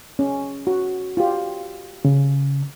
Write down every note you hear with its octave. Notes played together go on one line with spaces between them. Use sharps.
C#4
F#4
F4 G4
C#3